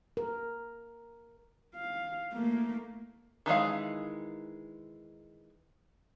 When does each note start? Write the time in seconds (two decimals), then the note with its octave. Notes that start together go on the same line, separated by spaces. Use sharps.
0.17 A#4
1.75 F5
2.33 A3 A#3
3.46 D#3 E3 G#3 F5